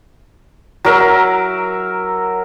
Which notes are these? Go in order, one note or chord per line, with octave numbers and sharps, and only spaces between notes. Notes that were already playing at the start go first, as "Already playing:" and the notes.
F#3 A#4 E5